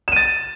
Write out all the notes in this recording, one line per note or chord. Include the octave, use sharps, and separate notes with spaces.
A6 D#7 E7